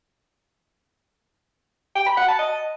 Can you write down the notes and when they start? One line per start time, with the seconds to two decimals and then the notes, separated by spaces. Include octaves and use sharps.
1.96 G5
2.06 B5
2.17 F#5
2.28 A5
2.39 D#5